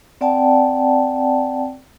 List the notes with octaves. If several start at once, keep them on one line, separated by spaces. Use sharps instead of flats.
C4 D5 F#5 G5 A5